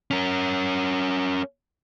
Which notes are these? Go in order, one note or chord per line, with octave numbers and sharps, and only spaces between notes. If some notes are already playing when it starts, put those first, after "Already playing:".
C#4 A#4